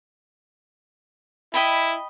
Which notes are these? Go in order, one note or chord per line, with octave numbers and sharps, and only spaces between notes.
E4 D#5 G5 B5